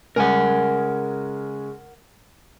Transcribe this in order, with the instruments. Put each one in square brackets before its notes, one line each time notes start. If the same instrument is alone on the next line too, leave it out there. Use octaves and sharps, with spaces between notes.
[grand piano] C#3 G#3 G#5 [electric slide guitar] A#4 F#5